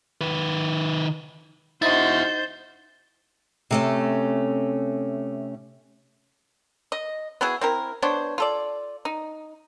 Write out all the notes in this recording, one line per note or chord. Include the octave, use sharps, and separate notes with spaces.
D#3 B4
D#4 E4 F#4 C5 D#5 G6 A6
C3 A3 C#4
D#5
B3 E4 F#4 G#4
C4 E4 A#4
B3 D4 C5 C#5
F4 A4 D5
D#4